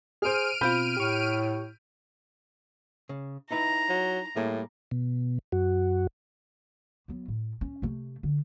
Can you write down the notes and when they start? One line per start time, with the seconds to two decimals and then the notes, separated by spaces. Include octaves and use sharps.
0.22 G#4 C5 F6 D7 D#7
0.61 B2 C4 F4 B5 G6
0.97 A2 G4 C#6
3.09 C#3
3.51 D#4 E4 B4 A#5
3.89 F#3
4.36 A2 G3 A#3 G#4
4.91 B2
5.52 F#2 F#4
7.08 F#3 B3
7.28 A2
7.61 C#4
7.82 C3 A3
8.23 D3